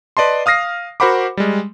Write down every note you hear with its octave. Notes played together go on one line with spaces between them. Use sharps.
B4 D5 D#5 A5 C6
F5 D#6 F6 A#6 C7
F#4 A#4 C5 F#5 B5 D6
G3 G#3